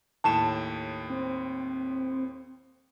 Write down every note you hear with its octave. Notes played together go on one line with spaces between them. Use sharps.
D#2 A2 A5 E7
C4